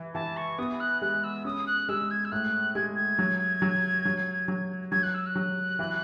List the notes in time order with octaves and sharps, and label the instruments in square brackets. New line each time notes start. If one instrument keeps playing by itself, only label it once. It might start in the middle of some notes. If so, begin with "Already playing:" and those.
Already playing: [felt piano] E3
[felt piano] E3 [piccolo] A5
[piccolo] C#6
[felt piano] B3 [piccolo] D#6
[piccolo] F#6
[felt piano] G#3 [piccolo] F#6
[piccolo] E6
[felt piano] C#4 [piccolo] D#6
[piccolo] F#6
[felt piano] G#3 [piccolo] E6
[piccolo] G#6
E6
[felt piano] A2 [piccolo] F#6
[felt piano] G#3 [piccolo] G#6
[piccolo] G#6
[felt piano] F#3
F#3
F#3
F#3
[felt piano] F#3 [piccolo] G#6
[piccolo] F#6
E6
F#6
[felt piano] F#3
E3